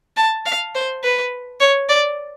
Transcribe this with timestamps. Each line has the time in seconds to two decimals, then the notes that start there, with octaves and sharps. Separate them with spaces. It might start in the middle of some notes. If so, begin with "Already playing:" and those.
0.17 A5
0.46 F5
0.75 C5
1.03 B4
1.60 C#5
1.89 D5